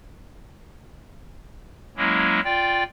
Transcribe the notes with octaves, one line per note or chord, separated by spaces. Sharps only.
F#3 G#3 A#3 C#4 E4
F4 D5 G5